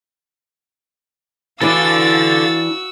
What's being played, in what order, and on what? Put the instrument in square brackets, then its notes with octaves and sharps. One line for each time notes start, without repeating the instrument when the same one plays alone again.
[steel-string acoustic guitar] E3 D4 [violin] F#4 E6 [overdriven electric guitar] A4 D5 [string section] F5 A6